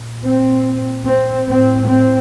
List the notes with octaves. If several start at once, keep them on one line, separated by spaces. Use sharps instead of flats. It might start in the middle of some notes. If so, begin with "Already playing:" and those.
Already playing: A#2
C4
C4
A2 C4
C4